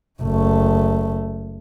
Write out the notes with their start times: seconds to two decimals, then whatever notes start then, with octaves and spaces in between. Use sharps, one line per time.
0.22 F#1 A3